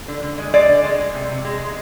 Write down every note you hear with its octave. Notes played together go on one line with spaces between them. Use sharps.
D3
D3
G#3
G#3 D5
D3
G#3
G#3
C3
C3
G#3
G#3